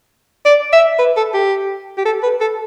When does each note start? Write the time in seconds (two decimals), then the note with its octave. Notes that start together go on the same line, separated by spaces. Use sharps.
0.45 D5
0.73 E5
0.99 B4
1.17 A4
1.34 G4
1.98 G4
2.05 A4
2.23 B4
2.41 A4